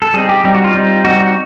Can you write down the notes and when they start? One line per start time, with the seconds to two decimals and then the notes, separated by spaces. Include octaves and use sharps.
0.02 A4
0.14 G3 C4 D#4 G#4
0.29 G4
0.44 G3 C4 D#4 G4
0.55 F#4
0.64 F4
0.74 G3 C4 D#4
1.05 G3 C4 D#4 F#4
1.20 F#4